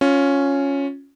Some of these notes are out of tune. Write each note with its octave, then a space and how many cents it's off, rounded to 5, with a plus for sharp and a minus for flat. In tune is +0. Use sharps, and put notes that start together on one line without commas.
C#4 +0 F4 +20